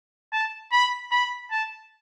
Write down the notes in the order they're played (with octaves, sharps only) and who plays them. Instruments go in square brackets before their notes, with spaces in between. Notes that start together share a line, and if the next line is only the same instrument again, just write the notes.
[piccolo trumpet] A5
B5
B5
A5